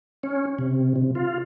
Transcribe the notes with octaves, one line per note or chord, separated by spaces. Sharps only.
C#4
C3
C3
F4